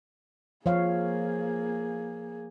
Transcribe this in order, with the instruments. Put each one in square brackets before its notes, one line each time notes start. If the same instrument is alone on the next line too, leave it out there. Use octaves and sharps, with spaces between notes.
[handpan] F3 C#5 F5 [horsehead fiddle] A#3 G#4